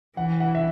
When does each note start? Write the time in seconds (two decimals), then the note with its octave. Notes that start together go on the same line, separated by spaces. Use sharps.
0.17 E3 F#5
0.40 F#5
0.55 E5